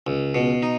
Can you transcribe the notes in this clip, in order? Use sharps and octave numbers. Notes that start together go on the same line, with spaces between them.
C#2
B2
D#4